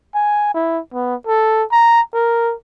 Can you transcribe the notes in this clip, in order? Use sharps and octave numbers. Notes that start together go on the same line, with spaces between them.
G#5
E4
B3
A4
A#5
A#4